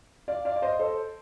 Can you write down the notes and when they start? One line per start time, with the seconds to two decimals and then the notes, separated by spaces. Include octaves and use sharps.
0.28 D5 F5
0.45 D5 F5
0.56 D5
0.62 C5 D#5
0.79 A4 C5